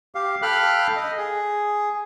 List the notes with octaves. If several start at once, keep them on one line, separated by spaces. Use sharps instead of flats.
G4 F5
A4 F5 G5 B5 F6 F#6
D#5
G#4